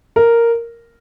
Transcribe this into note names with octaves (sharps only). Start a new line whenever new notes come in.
A#4